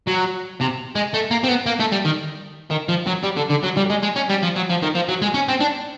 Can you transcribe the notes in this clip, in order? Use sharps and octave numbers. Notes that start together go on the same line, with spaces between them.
F#3
C3
G#3
A3
A#3
C4
B3
A#3
A3
G3
D#3
D#3
F3
F#3
G3
D3
D3
F#3
G3
G#3
G#3
C#4
G3
F3
F#3
F3
D#3
F3
F#3
G#3
C#4
C4
D4